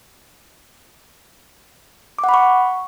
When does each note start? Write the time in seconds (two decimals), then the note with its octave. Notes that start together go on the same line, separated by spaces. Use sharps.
2.18 D6
2.24 F#5
2.29 B5
2.34 C#6